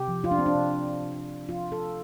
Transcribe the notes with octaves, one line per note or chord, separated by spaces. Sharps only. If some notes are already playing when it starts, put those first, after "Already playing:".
Already playing: C3 G4
F3
F4
D4
C4
D4
C3
C3
F3 F4
A4